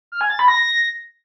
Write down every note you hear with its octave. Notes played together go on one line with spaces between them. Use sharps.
F6
G#5
A6
B5
A#6